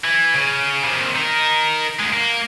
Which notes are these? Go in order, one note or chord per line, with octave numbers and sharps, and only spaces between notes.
E3
C#3
C3 D#3
D#4 A#4
D2 G#3
A#3